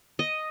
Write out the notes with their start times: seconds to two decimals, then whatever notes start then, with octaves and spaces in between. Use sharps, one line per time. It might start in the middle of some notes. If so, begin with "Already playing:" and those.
0.19 D#5